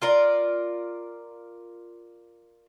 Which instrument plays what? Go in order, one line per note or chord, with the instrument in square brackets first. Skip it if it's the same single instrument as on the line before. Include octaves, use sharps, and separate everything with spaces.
[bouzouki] F4 A#4 D5